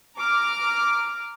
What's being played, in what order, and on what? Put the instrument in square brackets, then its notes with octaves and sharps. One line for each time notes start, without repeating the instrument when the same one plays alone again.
[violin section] A#5 D6 F6